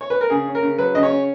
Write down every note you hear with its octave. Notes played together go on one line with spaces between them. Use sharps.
C#5
B4
A#4
C#3 G#4
C#4
A#4
C#3
F#3 B4
C#3 D#5
C#5
C#4